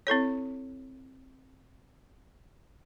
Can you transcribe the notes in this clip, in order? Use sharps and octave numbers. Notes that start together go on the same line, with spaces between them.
C4 E4 A4 C#5